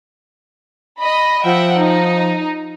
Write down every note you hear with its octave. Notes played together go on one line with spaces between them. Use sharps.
D#5 B5
F3 E5 F#5 G5
D#4